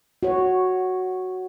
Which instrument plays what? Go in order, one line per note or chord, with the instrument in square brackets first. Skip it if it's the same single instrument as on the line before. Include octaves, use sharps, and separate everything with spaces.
[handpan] F#4 C#5